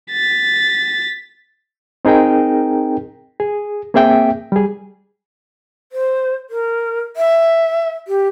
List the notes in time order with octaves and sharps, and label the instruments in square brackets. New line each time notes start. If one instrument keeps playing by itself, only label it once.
[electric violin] A6 B6
[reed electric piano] C4 D#4 G#4 A#4 G5
G#4
A#3 C4 G#4 E5 G5
G3 G#4
[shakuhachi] C5
A#4
E5
G4